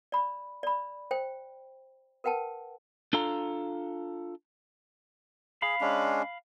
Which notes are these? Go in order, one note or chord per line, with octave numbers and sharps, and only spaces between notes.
D5 B5
D5 B5
C5 G5
A#4 B4 F#5 G5 A5
D4 F4 A4 F5 A#5
G#4 F5 B5
G#3 C#4 D4